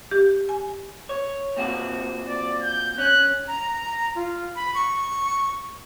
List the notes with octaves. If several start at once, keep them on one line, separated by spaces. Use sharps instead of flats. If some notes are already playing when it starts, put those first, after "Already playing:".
G4
G#5
C#5
A#2 C4 F#4
D5
G6
C#4 F#6
A#5
F4
B5
C#6